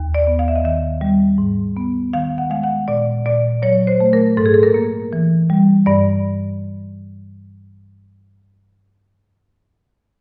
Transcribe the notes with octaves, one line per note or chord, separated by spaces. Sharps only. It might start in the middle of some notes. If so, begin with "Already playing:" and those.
Already playing: D#2
D5
B3
F5
E5
D#5
D#3 E5
G3
G#2
B3
D#3 F5
F#5
G#3 F5
F#5
A#2 D5
A#2 D5
F#3 C#5
C5
A3
A#4
G#2 A4
G#4
A4
A#4
A#3
E3
G3
G2 D5